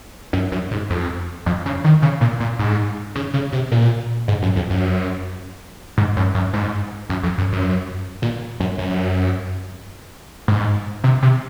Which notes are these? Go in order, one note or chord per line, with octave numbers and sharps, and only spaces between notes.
F#2
F#2
G#2
F2
F2
C#3
D#3
C#3
A#2
A#2
G#2
C#3
C#3
C3
A#2
G#2
F#2
F2
F#2
G#2
F#2
F#2
G#2
F#2
F2
F#2
F#2
A#2
F#2
F#2
G#2
C3
C3